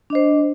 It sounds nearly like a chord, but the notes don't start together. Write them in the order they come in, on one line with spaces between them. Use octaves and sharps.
D4 D#5 C5